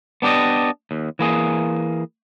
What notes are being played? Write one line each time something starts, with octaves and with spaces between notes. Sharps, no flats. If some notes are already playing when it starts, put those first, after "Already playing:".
B3 D4 G4 D5 D#5
D#2
E3 A#3 G#4